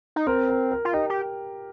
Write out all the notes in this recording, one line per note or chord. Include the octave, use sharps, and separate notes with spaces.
D#4
C4 A#4
A#4
A#4
F4
D#4 G4
G4